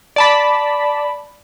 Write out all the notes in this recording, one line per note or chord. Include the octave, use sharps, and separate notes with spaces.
D5 A5 B5